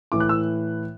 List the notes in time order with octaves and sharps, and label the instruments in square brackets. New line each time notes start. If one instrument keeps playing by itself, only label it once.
[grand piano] A2 E3 D6
F#6
E6